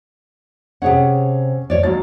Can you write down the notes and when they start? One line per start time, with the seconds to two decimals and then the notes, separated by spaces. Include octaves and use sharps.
0.82 C3 C#4 G#4 C#5 F#5
1.70 C#5 D5
1.83 D#2 F#3 A6